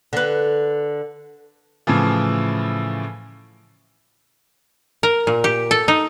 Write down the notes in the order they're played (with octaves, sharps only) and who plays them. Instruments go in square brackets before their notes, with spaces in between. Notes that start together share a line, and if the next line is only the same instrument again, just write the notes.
[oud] D3 B4
[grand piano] A2 C#3 E3 F3
[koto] A#4
A#2
G4
A4
D#4